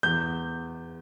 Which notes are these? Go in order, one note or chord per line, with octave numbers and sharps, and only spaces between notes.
E2 G6